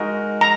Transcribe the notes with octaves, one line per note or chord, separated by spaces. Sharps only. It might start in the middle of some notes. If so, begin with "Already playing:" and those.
Already playing: G#3 D#4 F#4 A#4 D#5
A#5